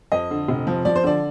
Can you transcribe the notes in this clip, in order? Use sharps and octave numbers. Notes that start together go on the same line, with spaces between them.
F2 D#5
D3
F1
F3
F3 D5
C5
D3 D5